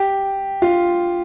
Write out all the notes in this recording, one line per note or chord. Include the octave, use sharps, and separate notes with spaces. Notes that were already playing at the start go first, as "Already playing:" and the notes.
Already playing: G4
F4